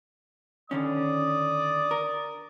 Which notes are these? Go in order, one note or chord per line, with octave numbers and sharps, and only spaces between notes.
D3 D#3 C#4 D5 D#6
A#4